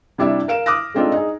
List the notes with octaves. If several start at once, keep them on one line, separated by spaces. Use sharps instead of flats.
C3 G3 D4 E4 G4 E5
A#4 F5 D7 E7
D6 D#6 F6 F#6 A#6
G#3 A3 C4 D4 D#4 F4
D#4 G#4